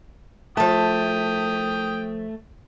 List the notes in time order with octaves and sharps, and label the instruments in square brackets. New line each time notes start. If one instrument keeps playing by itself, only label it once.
[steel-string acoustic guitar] F3 A5 [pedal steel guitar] A3 [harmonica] G5 D#6